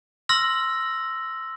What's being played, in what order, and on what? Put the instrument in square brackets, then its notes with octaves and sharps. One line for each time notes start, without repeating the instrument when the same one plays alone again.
[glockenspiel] C6 E6 F6 A#6 F#7